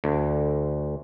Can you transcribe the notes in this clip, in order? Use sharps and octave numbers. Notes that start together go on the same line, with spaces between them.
D2